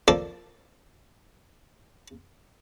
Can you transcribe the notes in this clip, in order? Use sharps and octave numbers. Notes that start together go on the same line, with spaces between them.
F3 A#3 A4 D5